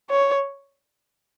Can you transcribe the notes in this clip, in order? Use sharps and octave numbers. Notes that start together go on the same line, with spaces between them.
C#5